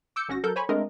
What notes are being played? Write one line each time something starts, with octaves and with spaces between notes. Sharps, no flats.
D6 E6 G6 C#7
G#1 C#4 F#4 A#6
F#3 A4 A#4 G6
C5 C#5 G#5 B5 C#6
G#3 A3 C4 D4 A#4 D#5